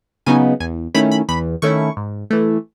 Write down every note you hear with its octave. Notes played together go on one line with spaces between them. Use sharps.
C#3 F#3 B3 D#4 G#5
E2 G#5
D#3 A3 C#4 E4 B5
B5
E2 B5
D#3 A3 C#4 E4 C#6
G#2
E3 A3